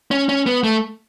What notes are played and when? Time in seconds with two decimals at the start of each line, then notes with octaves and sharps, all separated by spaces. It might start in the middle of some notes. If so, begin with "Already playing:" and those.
0.11 C#4
0.29 C#4
0.46 B3
0.64 A3